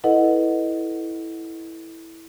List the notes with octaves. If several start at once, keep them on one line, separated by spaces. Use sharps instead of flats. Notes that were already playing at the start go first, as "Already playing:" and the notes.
E4 A4 B4 D#5 F#5